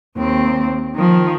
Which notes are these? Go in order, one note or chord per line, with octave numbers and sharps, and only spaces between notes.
D#2 C4
D#3 F3